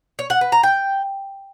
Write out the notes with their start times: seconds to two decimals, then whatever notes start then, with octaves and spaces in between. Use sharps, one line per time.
0.19 C#5
0.30 F#5
0.41 B4
0.52 A#5
0.63 G5